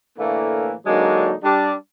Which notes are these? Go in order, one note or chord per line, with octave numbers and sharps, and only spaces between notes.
A2 D3 E3 A3 A#3
D3 F#3 G#3 A#3 D4 D#4
G3 D4